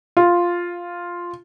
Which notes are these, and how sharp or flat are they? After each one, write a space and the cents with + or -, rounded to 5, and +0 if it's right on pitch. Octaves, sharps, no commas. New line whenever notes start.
F4 +0